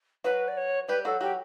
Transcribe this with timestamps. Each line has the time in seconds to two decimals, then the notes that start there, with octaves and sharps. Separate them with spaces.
0.24 F#3 F#4 B4
0.48 D5
0.57 C#5
0.88 G3 G4 B4
1.05 F#3 F#4 A4
1.21 F#3 F#4 G4